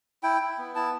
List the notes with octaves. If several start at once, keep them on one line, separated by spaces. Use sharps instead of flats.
E4 G5
E4
B3
E4 A5